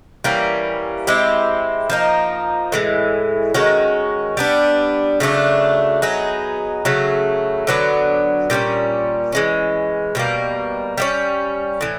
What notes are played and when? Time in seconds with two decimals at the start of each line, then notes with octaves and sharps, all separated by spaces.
0.24 E3 G3 A#3 C#4
1.07 G#3 C4 E4 G4
1.90 F3 A#3 D#4
2.72 A2 E3 G#3
3.54 D#3 G#3 C#4 F#4
4.37 G3 B3 D4
5.20 C#3 F#3 A3 D4
6.02 F#3 B3 D#4 G#4
6.85 C#3 F#3 A3
7.67 D3 F#3 B3 D4
8.50 A#2 G3 A#3 C#4
9.32 E3 G#3 C#4
10.15 B2 G3 A#3
10.98 G3 A#3 C#4
11.81 A2 E3